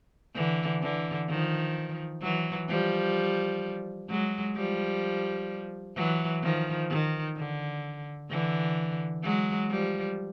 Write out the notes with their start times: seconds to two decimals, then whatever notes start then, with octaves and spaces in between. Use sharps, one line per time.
0.35 D3 E3
0.82 D3 E3
1.29 D#3 F3
2.22 E3 F#3
2.69 F3 G3
4.09 F#3 G#3
4.56 F3 G3
5.96 E3 F#3
6.43 D#3 F3
6.90 D#3
7.37 D3
8.30 D3 E3
9.24 F#3 G#3
9.70 F3 G3